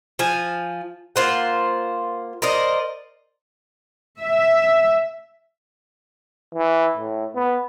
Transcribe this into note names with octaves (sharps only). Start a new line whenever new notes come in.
F3 G#5
A#3 F4 C5 F#5
A#4 C5 D5 D#5
E5
E3
A2
B3